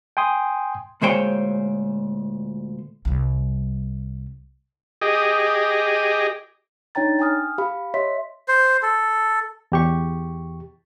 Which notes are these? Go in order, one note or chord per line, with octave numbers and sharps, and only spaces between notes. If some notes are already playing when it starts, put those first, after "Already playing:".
G5 G#5 C6 D#6
D2 A#2 G#3 C5 C#5 G5
C2 G3
G4 G#4 D#5
D4 D#4 C#5 G5 A#5 A6
G5 G#5 D#6 F6
G4 F5 B5
C#5 D#5 E5 C6 B6
C5
A4
E2 G4 C#6